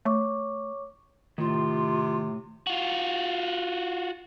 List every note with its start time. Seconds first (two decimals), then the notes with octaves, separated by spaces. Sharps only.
0.05 A3 C#5 C#6 D6
1.38 A2 C3 D#3 F4
2.67 F4 F#4